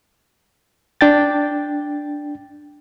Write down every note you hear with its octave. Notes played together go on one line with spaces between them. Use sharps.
D4 G5 A6